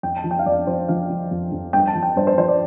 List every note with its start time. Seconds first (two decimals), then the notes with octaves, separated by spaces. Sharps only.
0.03 F2 G5
0.17 A5
0.24 F3
0.31 G5
0.39 F5
0.46 F2 D5
0.67 F2 C5
0.88 F3 F5
1.10 F3
1.31 F2
1.52 F2
1.73 G2 G5
1.87 A5
1.95 F3
2.03 G5
2.17 G2 C5
2.27 C5
2.38 F3 C5
2.48 D5